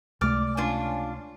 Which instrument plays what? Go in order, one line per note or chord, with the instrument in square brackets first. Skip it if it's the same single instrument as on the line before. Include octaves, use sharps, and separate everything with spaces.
[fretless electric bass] C#2 C3 A3 [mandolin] D5 D6 F6
[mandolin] C#4 D4 F4